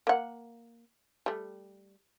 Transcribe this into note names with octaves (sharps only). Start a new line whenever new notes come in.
A#3 F#5
G3 A3